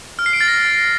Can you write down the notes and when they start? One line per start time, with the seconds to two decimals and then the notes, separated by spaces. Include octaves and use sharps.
0.19 F6
0.26 C7
0.33 D7
0.41 A6
0.48 A#6